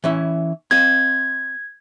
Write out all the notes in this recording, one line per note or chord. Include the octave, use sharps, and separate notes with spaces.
E3 C#4 E4
C4 D#5 F5 G#6